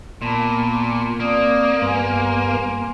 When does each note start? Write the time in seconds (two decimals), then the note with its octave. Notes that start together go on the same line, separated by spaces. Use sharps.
0.22 A#2 B3 A5 B5
1.20 A#3 C4 D5 D#6
1.82 G2 B3 G#5 C6